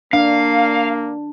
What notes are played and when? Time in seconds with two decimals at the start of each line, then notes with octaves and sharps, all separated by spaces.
0.13 A#3 D4 F5